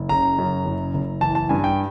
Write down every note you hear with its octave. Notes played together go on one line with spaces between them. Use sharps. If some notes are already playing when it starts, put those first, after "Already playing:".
Already playing: F#1
C#3 A#5
F#2
F#1
F#1
E3 A5
A5
G2 G#5
G5